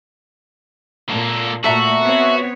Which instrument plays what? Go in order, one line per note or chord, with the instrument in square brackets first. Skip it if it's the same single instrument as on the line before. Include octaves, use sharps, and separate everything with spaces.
[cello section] A#2 [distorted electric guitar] A#3 A4
[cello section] A#2 A3 [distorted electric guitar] F#4 [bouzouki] A4 E5 A#5
[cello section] B3 C4 C#5